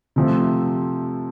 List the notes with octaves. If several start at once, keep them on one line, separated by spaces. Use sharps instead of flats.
C3 F3 A3 C4